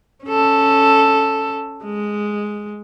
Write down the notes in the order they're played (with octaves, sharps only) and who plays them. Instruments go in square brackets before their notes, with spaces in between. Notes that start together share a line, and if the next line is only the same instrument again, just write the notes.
[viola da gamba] C#4 A4
G#3